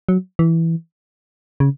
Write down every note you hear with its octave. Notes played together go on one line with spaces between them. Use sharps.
F#3
E3
C#3